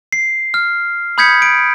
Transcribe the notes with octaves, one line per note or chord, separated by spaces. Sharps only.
C7
F6
B5 D#6 G6 G#6 B6 C#7
D7